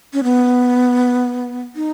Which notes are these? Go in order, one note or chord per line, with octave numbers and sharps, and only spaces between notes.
C#4
B3
D#4